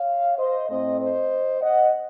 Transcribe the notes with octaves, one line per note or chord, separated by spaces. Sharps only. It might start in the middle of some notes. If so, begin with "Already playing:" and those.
Already playing: C#5 F5
C5 D#5
A2 A3 C4 C5 D#5
C5 D#5
D#5 F#5